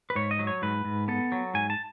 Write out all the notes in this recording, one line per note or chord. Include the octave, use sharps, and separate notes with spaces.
B4
G#2 C#5
D#5
F#3
C#5
G#2 B4
G#2
B3 A4
F#3
G#2 G#5
A5